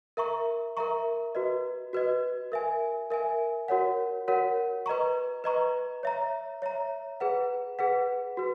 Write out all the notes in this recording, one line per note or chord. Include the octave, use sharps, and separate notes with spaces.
A#4 E5 A#5 C#6
A#4 E5 A#5 C#6
F#4 B4 D#5
F#4 B4 D#5
A#4 E5 G#5
A#4 E5 G#5
F#4 A#4 C#5 F#5
F#4 A#4 C#5 F#5
B4 D#5 A#5 C#6
B4 D#5 A#5 C#6
C#5 E5 A#5
C#5 E5 A#5
G#4 B4 F#5
G#4 B4 F#5
F#4 B4